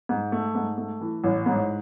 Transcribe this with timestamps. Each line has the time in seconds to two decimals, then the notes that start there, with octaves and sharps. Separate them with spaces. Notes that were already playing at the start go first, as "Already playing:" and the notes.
0.09 G#2
0.32 A3
0.55 G#2
0.78 A3
1.01 E3
1.24 A1
1.46 G#2